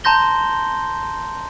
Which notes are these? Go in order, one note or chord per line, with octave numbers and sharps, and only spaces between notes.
A5 A#5 C6 G6 A#6 G7